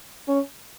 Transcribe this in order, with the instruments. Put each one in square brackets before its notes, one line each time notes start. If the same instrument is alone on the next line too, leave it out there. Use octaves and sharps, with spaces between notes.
[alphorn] C#4